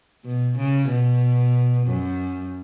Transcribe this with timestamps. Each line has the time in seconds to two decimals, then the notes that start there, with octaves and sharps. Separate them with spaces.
0.25 B2
0.58 C#3
0.90 B2
1.86 F#2